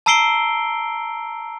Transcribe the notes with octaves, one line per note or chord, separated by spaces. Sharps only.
A5 A#5 E6 C7 D7 G7